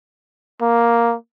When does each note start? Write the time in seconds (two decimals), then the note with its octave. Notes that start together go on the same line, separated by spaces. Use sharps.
0.61 A#3